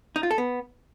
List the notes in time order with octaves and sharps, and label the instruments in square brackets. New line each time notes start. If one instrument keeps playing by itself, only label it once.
[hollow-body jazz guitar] D#4
F4
A4
B3